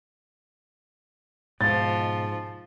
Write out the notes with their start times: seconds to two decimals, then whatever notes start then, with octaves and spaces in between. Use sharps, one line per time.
1.61 G#2 B2 F3 A6